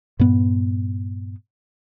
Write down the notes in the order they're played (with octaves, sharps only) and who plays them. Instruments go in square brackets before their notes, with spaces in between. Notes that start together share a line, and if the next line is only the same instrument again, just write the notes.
[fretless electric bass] G2 A#2 B3